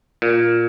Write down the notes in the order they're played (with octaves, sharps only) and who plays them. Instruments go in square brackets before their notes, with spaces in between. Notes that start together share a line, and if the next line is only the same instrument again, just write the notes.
[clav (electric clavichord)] A#2